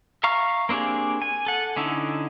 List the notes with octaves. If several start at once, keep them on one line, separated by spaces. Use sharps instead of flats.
E5 F5 A#5 C#6 F6
A#3 C4 D4 G4 G#4
G#5
A4 F#5
D3 C#4 D#4 E4